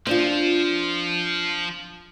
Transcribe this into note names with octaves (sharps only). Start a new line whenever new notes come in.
F3 C4 D4 F4